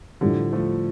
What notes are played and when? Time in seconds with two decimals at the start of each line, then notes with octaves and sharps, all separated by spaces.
0.21 A2 D3 F3 G3 D4 G4
0.53 F3 A3